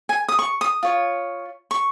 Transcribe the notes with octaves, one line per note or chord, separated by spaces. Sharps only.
G#5
D#6
C#6
D#6
F4 C#5
C#6